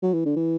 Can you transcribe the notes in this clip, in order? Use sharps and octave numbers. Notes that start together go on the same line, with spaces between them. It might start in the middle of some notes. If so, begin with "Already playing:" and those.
F#3
E3
D3
E3